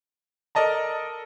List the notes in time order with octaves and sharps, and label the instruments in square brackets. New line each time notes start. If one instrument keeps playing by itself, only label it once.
[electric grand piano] A4 A#4 D5 D#5 A5 A#5